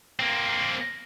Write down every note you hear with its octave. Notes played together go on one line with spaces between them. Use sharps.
A#3 C4